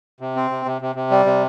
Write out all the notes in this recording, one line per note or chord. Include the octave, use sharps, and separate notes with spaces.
C3
C4
C3
C3
C3
C3
G3
C3